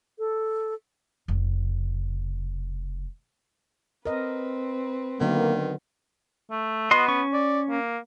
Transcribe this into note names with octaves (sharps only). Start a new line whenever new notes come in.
A4
F1 C#3
C4 A#4 B4 D#5
D3 D#3 F#3 A#3 B3
A3
B3 F#4 D#5 C6
C#4 C#6
D5
A#3